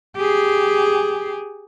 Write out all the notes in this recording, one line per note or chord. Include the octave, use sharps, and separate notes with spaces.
G4 G#4